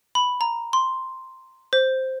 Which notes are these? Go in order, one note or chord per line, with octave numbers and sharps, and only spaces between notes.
B5
A#5
C6
C5